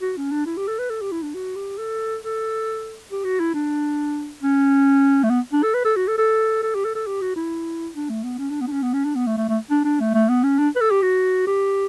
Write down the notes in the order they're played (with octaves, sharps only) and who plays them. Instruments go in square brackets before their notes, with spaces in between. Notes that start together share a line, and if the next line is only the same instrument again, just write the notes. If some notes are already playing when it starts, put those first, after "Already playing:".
[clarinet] F#4
C#4
D4
E4
G4
A4
B4
A4
G4
E4
D4
F#4
G4
A4
A4
G4
F#4
E4
D4
C#4
A3
B3
D4
A4
B4
A4
F#4
A4
A4
A4
G4
A4
A4
G4
F#4
E4
D4
A3
B3
C#4
D4
B3
D4
C#4
B3
C#4
D4
B3
A3
A3
A3
D4
D4
A3
A3
B3
C#4
D4
B4
A4
G4
F#4
G4